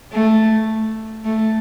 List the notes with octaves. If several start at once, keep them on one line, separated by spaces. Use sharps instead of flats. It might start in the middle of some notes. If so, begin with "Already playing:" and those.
A3
A3